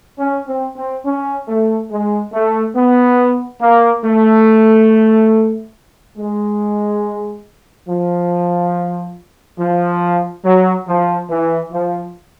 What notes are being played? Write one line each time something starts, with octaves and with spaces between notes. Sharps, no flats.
C#4
C4
C4
C#4
A3
G#3
A3
B3
A#3
A3
G#3
F3
F3
F#3
F3
E3
F3